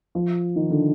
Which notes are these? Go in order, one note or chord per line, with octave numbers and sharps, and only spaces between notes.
F3
D#3
D3